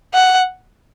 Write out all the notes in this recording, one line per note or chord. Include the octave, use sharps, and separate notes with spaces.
F#5